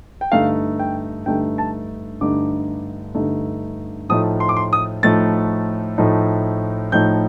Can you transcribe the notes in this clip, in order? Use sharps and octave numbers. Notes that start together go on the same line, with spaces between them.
G5
G2 D3 A3 D#4 F5
G5
G2 D3 A3 D#4 G5
A5
G2 D3 A3 D#4 D6
G2 D3 A3 D#4
A2 F3 A3 D#4 D#6
C6
D6
C6
D#6
A2 F3 A3 D#4 A6
A2 F3 A3 D#4
A2 F3 A3 D#4 G6